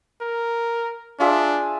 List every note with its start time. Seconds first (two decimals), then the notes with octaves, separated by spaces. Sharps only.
0.21 A#4
1.20 D4 F4 G#4 E5